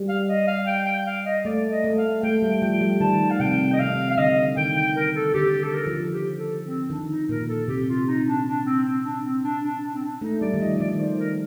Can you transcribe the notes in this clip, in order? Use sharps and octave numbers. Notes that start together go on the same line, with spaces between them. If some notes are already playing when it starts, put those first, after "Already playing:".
Already playing: G3
F5
D#5
F5
G5
G5
F5
D#5
A3 D5
D#5
A3
F5
A3 G5
G3
F3 G5
G3
D#3 A5
F5
C3 G5
D#5
C3 F5
F5
D3 D#5
D#3 G5
G5
A#4
A4
D3 G4
A4
A#4
F3
G4
A4
C4
D#3 D4
D#4
A#2 A#4
A4
C3 G4
F4
D#4
D4
D4
C4
C4
D4
C4
D4
D4
D4
C4
D4
A3 D#4
G3 D5
D#3
F3 D#5
D#3 D5
D5
C5
A#4